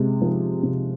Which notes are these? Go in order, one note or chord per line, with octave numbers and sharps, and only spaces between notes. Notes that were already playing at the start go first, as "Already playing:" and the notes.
Already playing: C3 G#3
F3
C3